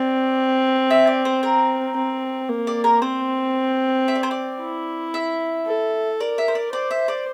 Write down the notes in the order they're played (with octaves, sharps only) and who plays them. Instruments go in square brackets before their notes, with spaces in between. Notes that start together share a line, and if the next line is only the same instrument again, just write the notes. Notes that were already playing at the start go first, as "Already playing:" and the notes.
Already playing: [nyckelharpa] C4 [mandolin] D5
[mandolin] E5
D5
C5
A#4
[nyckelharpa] C4
A#3
[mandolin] D5
A#4
[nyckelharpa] C4 [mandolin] C5
[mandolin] E5
D5
C5
D5
[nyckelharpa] E4
[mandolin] E5
[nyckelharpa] A4
[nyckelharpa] A#4 [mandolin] D5
[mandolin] E5
C5
D5
[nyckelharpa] C5 [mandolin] D5
[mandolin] E5
D5